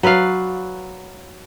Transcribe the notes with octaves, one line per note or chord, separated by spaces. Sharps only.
F#3 B4 D5 F5